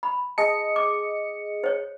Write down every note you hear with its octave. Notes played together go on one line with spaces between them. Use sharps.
B5
G#4 D#5 A5 C#7
D6
C5 C#5